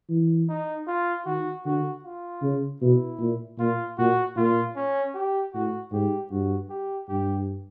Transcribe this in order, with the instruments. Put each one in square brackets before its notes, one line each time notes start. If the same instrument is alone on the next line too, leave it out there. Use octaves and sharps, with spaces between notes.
[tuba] E3
[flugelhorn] D#4
F4
[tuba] D#3 [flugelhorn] F#4
[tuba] D3 [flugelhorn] F#4
[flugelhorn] F4
[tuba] C#3
[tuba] B2 [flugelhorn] E4
[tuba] A#2
[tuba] A#2 [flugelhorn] F4
[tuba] A#2 [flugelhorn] F#4
[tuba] A#2 [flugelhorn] F4
[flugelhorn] C#4
G4
[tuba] A2 [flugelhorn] F#4
[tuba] G#2 [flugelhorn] G4
[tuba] G2 [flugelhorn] F#4
[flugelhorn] G4
[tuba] G2 [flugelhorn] G4